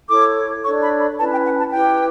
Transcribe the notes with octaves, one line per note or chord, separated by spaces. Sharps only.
E4 A4 C#5 D6
D4 A4 C#5 C#6
B5
B5
C#4 E4 B4 A5
G5
F#5
A5
E4 G4 B4 G5